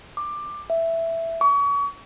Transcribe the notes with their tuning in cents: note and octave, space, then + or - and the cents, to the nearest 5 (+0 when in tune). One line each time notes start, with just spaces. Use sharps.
D6 +15
E5 +5
C#6 +35